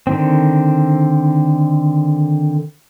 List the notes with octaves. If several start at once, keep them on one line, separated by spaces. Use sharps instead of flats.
D3 D#3 C4